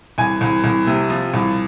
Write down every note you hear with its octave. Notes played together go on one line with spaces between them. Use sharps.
C2 G#5
C2
C2
C3
F3
C2